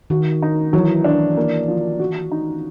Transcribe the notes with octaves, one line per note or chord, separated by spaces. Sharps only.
D#3 F#4
D#4
E3 F#3
D4
A#3
F3
F#4
D#4